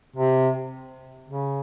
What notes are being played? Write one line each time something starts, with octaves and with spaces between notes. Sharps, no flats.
C3
C#3